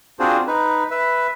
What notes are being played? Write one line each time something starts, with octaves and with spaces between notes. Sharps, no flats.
C4 D4 F4 F#4 G#4 C5
D#4 B4
B4 E5